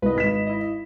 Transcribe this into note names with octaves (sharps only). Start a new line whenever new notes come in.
C2 B4 D#5
G#1 B6 E7
E4 D#5